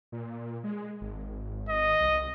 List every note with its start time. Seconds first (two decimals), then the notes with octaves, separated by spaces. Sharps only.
0.12 A#2
0.64 G#3
1.01 G#1
1.69 D#5
2.01 C2